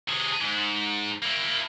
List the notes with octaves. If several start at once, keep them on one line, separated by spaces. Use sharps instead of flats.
C3 G#4
G#2
A#3 E4